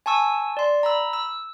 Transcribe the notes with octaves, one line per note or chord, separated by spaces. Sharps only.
G#5 A5 C#6 E6
D5 C6
A#5 B5 E6
E6